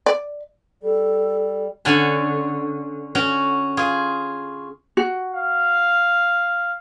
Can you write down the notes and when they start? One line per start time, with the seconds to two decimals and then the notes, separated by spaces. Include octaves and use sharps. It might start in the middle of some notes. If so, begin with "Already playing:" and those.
0.06 D5
0.83 G3 A4
1.85 D3 C#4 F#5 G#5 A5
3.15 C#4 F#4
3.77 F4 G#4
4.97 F#4
5.33 F5